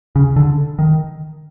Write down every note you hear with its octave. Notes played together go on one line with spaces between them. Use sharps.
C#3
D3
D#3